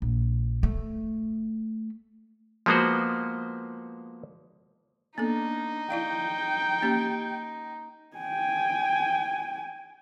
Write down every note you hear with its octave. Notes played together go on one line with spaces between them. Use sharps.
A#1
A3
F3 G#3 A#3 B3 F#4 C5
A#3 B3 D4 D#4 A4
E4 D5 F5 G5
A#3 C#4 G4
G5 G#5